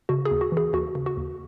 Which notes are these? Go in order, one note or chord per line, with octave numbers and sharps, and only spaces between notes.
C#3 F#4
G#4
D#2
F#4
E3
G#4
D#2 F#4
C#3
F#4
D#2